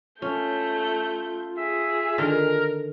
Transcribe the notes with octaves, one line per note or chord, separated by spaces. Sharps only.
A3 C#4 F4 G6
G#4 E5
D3 D#3 A#4 A5